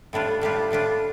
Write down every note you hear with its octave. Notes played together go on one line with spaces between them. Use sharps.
A2 G3 D4 F4
A2 G3 D4 F4
A2 G3 D4 F4